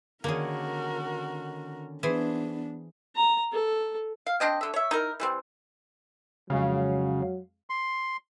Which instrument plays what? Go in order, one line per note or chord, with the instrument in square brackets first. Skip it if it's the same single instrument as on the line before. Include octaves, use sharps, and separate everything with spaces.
[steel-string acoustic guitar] D3 D#3 C#4 [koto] A#3 G#4 [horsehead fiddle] F#4 A#4
[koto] E3 G#4 C5 [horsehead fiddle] B3 D4
[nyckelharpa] A#5
A4
[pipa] F5
C4 D4 D#5 G5
D3 E5
C#5 E5
D#4 E4 A#4
E3 G3 C4
[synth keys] F2 G#3 F5 [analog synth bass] C#3 [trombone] F#3
[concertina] C6